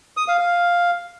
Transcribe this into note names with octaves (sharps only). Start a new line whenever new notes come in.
D#6
F5
F5